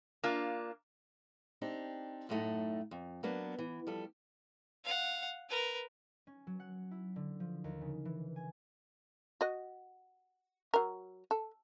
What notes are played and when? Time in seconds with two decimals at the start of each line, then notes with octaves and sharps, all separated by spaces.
0.24 A#3 D4 F4
1.61 C4 D4 D#4 G4
2.29 F#2 A2 F3 A3 D#4 F#5
2.91 F2
3.23 F#3 A#3 B3 D4
3.59 E3
3.87 F3 G3 A4
4.85 F5 F#5
5.49 A#4 B4
6.27 C#4
6.47 F#3
6.60 F#5
6.91 E4
7.16 D3
7.40 F3
7.64 D#2
7.81 C#3
8.05 E3
8.36 G#5
9.41 F#4 D#5
10.74 F#3 A#4
11.31 A4